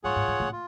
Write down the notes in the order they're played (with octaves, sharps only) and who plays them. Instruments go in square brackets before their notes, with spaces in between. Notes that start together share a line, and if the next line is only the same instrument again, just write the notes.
[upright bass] G#2 [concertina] F4 G#4 C#5 F#5
[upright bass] G#2
G#2
A2
[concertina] F4